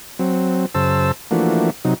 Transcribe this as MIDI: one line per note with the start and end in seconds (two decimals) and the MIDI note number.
0.19 0.66 54
0.19 0.66 60
0.75 1.12 42
0.75 1.12 49
0.75 1.12 72
0.75 1.12 81
0.75 1.12 88
1.31 1.70 52
1.31 1.70 53
1.31 1.70 57
1.31 1.70 58
1.31 1.70 62
1.31 1.70 66
1.85 1.94 48
1.85 1.94 54
1.85 1.94 63